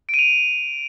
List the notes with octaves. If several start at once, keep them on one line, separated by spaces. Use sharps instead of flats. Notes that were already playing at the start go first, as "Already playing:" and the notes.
D7
D#7
F7